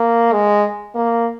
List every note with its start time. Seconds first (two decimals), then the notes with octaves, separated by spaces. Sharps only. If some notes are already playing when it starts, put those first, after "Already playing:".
Already playing: A#3
0.33 G#3
0.95 A#3